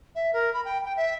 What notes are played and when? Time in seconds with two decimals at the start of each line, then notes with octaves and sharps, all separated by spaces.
0.15 E5
0.33 A#4
0.54 B5
0.65 G5
0.85 G5
0.97 E5